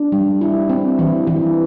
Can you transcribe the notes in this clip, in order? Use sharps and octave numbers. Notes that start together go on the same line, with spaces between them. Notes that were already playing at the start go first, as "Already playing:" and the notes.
Already playing: D4
G3
E4
C4
E3
E3